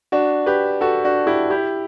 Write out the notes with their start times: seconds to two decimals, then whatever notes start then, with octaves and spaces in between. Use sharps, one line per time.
0.12 D4 F#4
0.46 G4 B4
0.81 F#4 A4
1.04 D4 F#4
1.27 E4 G4
1.50 E4 G4